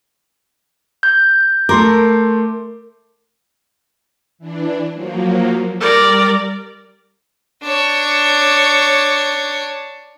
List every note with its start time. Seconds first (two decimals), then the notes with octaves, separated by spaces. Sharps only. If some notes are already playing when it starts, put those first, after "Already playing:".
1.03 G6
1.69 A3 A#4 C6 D6
4.39 E3 D4
4.92 F3 F#3 A#3
5.80 G3 A#4 D5
7.63 D4 C#5